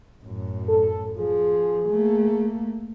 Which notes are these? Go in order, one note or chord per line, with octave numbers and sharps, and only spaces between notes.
F#2 A2
A4
F3 G#4
A3 A#3